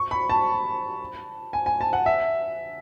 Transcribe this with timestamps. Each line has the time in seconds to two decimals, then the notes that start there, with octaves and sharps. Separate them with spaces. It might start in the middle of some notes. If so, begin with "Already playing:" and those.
Already playing: C#6
0.11 B5
0.30 A5
1.53 G#5
1.66 G#5
1.81 A5
1.93 F#5
2.06 E5